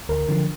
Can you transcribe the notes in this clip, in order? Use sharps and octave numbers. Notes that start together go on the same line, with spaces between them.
D2 A#4
D3 F3